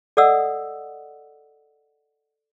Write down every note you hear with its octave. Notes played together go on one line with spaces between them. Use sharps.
A4 D5 D#5 F#5 D#6 E6